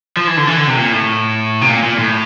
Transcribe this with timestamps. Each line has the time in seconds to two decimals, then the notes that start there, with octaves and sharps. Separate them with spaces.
0.17 F3
0.27 E3
0.37 D3
0.47 E3
0.57 D3
0.68 C3
0.77 A#2
0.92 A2
1.61 C3
1.69 A#2
1.83 A#2
1.99 A2